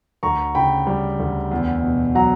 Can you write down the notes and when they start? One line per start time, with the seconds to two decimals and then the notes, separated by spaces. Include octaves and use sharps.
0.23 D2 A#5 C#6
0.55 C#3 G5 B5
0.87 G3
1.20 D2
1.51 E2
1.83 B2
2.15 F#3 F#5 A#5